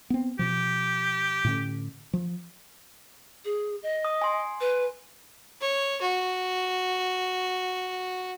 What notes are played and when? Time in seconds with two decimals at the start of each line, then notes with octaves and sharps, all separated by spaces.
0.10 B3 C4
0.39 B2 F3 G4
1.45 A2 D3 C#4
2.13 F3
3.45 G#4
3.83 D#5
4.05 D#6
4.22 G#5 C6
4.60 B4
5.61 C#5
6.01 F#4